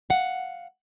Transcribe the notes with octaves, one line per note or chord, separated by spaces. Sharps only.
F5 F#5